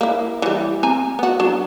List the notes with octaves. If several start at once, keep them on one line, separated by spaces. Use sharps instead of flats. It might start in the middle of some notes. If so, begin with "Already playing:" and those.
A#3 E4
E3 G3
C4 G#5 A#5
B3 F#4
F#3 D4